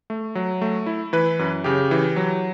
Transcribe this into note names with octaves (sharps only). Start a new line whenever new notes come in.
A3
F#3
A3
E4
E3 B4
F#2
C#3 G4
E3
F#3